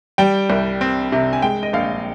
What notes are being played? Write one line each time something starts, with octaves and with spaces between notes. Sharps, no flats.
G3 G5
C2
C4
C3
G#5
G#3 G5
D#5
A#1 F5